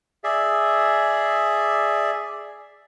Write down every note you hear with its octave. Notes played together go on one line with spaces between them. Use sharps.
G#4 D5 E5